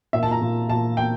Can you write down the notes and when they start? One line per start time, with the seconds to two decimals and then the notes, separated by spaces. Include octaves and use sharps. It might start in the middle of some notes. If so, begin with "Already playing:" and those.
0.13 A#2 E5
0.23 A5
0.31 A#5
0.41 A#2
0.69 A#2 A5
0.97 A#2 G5